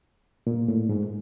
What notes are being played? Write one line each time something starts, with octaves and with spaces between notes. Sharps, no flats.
A#2
A2
G#2